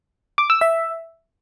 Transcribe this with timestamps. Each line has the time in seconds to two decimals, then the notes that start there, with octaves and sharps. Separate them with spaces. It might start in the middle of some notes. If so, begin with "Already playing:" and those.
0.38 D6
0.50 E6
0.61 E5